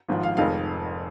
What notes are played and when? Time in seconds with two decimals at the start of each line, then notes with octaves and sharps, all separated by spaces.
0.08 G#1 G#2 F3
0.23 F5
0.37 F1 F2 D#3 G#3 D#4 F5